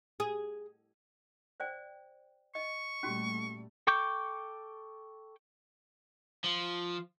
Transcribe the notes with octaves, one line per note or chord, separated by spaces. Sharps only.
G#4
C5 D5 G5
D#5 C#6
A#2 G3 A3 C#4 F#4 G4
A4 G5 C#6 D6 G6
F3